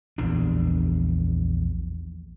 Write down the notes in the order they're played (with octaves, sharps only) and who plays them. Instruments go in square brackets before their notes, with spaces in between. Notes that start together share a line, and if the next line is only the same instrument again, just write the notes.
[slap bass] A#1 E2 D4